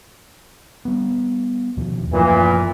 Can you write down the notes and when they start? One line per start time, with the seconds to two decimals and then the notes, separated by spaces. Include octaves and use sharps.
0.85 G3 B3
1.76 D#2 B2 F3
2.13 F#2 A#2 E3 F3 A3